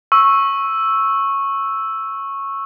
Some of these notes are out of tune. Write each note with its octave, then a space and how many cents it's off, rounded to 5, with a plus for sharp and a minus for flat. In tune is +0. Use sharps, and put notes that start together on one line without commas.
C#6 -10 E6 +0